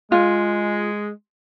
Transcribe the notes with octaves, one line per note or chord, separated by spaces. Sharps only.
G#3 F4